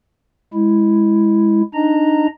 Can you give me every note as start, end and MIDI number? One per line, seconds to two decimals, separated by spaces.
0.54 1.62 56
0.54 1.62 64
1.74 2.27 62
1.74 2.27 63
1.74 2.27 75
1.74 2.27 82